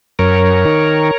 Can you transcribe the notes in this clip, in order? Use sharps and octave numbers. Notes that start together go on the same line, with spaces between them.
F#2 A#4 C#5
D#3